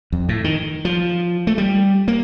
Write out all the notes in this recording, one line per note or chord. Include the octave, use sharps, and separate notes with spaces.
F2
A2
D#3
F3
A3
G3
A#3